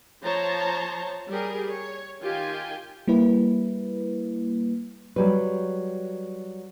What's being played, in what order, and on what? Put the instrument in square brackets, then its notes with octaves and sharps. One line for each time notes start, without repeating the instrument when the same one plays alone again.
[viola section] F3 C5 C#5 A5 A#5
G3 G4 G#4 A#4
C#5
D#3 F4 G4 G5 G#5
[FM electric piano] G3 A#3 E4 B4
[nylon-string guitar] F#3 G3 B4